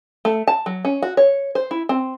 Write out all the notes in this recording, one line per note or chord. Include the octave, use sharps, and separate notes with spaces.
A3
A5
F#3
C#4
F#4
C#5
C5
E4
C4